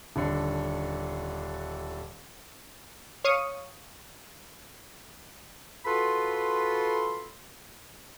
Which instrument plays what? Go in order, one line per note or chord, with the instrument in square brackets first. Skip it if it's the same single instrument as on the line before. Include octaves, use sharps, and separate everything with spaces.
[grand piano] D#1 D3
[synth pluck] C#5 F5 C#6 D#6
[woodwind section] F4 F#4 A4 B4 B5 C6